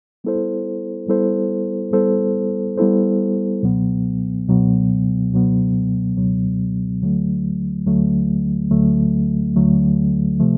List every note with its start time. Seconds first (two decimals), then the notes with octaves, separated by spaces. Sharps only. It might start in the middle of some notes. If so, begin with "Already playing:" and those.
0.24 G3 B3 E4 A4 C5
1.08 G3 B3 E4 A4 C5
1.93 G3 B3 E4 A4 C5
2.78 G3 B3 E4 A4 C5
3.63 C#2 B2 F#3 B3
4.48 C#2 B2 F#3 B3
5.32 C#2 B2 F#3 B3
6.16 C#2 B2 F#3 B3
7.02 D2 D3 F#3 A3
7.86 D2 D3 F#3 A3
8.71 D2 D3 F#3 A3
9.56 D2 D3 F#3 A3
10.40 C3 F3 A3